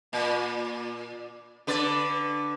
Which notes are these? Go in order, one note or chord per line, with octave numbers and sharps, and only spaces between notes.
A#2
D3 B4 D5